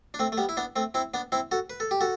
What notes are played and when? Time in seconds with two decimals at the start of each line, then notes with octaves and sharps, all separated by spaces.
0.14 D4
0.19 A3 C4
0.32 A3
0.37 G3 B3
0.49 E4
0.57 B3 D4
0.76 A3 C4
0.94 C4 E4
1.14 B3 D4
1.32 C4 E4
1.51 F#4 A4
1.70 B4
1.80 A4
1.91 G4
2.01 F#4 A4